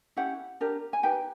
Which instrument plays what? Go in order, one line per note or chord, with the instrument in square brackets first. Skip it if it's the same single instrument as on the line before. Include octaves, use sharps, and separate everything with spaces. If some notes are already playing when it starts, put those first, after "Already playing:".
[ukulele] C#4 E4 G4 F#5
D4 G4 A#4
G#5
D#4 G4 B4 G5